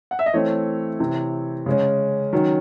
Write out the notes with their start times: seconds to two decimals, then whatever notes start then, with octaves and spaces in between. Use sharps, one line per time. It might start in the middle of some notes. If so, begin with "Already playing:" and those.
0.11 F#5
0.19 E5
0.26 D#5
0.34 E3 A3 C4 C#5
1.00 C3 E3 C4
1.66 C#3 G#3 C#4
2.33 D#3 F#3 C#4